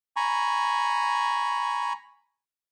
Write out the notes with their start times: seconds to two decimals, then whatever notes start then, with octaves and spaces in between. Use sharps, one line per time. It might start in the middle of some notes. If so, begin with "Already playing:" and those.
0.16 G#5 A#5 B5 C#6